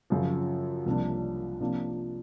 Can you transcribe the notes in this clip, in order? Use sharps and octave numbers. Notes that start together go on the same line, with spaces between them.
F#2 C#3 F3
C2 C3 F3 A#3 D4
C3 F3 A#3 D4